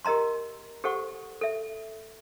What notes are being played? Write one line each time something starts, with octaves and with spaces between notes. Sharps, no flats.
G4 A#4 D#5 A#5 C6
G4 A4 C5 F#5 C#6
A4 E5